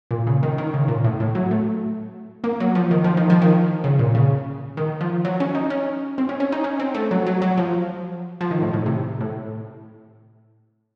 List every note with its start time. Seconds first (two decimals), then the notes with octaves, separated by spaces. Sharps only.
0.11 A#2
0.27 C#3
0.43 D#3
0.58 D#3
0.74 C#3
0.88 A#2
1.04 A2
1.20 A2
1.35 F#3
1.51 A3
2.44 A#3
2.60 F#3
2.75 F3
2.91 D#3
3.04 F3
3.17 D#3
3.30 F3
3.42 D#3
3.84 C#3
3.99 A#2
4.15 C#3
4.77 D#3
5.01 F3
5.25 F#3
5.40 C#4
5.55 D#4
5.70 C#4
6.18 C4
6.29 C#4
6.40 C#4
6.52 D#4
6.64 C#4
6.80 C4
6.95 A3
7.11 F#3
7.27 F#3
7.42 F#3
7.58 F3
8.41 F3
8.51 D#3
8.62 A2
8.73 A2
8.86 C3
9.21 A2